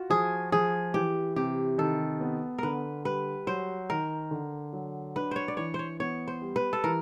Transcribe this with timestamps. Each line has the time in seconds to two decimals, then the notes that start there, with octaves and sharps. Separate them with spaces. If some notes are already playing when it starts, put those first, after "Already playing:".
Already playing: F4 F#4
0.10 F3 G#4
0.52 F3 G#4
0.94 E3 G4
1.36 C3 G4
1.78 D#3 A4
2.21 B3
2.58 D3 A#4 B4
3.05 G3 B4
3.47 F#3 C5
3.89 D#3 A#4
4.31 D3
4.73 F#3
5.16 D4 B4
5.31 C5 C#5
5.48 D5
5.57 E3 C#5
5.74 C5
5.79 C#5
6.00 B3 C#5
6.28 C5
6.42 G3
6.56 B4
6.73 A4
6.84 E3 A#4